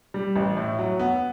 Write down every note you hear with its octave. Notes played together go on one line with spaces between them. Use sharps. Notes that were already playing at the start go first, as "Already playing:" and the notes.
G3
A1
A2
F#3
B3